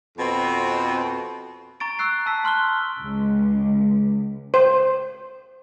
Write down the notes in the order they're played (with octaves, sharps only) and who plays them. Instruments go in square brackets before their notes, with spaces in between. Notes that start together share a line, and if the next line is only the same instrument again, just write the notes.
[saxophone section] F2 B2 C4
[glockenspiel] A#5 C#6 A6 D7
C#6 E6 F#6 C7
A5 E6 B6
A5 C6 F6 F#6 G7
[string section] C#2
[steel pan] C5